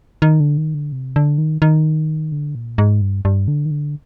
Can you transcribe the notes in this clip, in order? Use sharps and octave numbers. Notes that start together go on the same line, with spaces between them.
D#3
D3
D#3
D3
C3
D3
D#3
D#3
D3
A#2
G#2
G2
G2
D3
D#3
D3